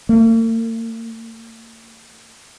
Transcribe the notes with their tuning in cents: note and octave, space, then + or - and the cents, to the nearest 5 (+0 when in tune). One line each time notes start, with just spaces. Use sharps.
A#3 -45